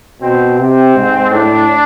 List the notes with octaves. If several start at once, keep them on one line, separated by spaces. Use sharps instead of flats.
B2 C4
C3 C4
G#2
A2 D4